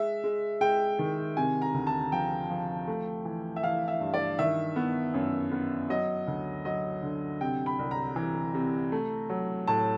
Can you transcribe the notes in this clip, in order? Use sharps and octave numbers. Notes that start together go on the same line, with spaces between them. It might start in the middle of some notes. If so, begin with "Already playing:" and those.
Already playing: G#3 E5
G#3
G#3 G5
D#3
C3 G#5
A#5
D2
A5
F3 G5
F3
A3
E3
E5
E3 F5
E5
G2
D5
D#3 E5
B3
F#2
B3
F#3 D#5
D2
F#3 D#5
D3
C3 G5
B5
C2
A#5
E3
C3
A3
F#3
A2 A5